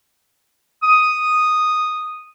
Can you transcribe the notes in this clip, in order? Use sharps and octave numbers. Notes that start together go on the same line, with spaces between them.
D#6